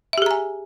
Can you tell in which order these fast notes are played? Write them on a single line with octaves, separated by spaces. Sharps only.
E5 G4 G#4 A#5 G#5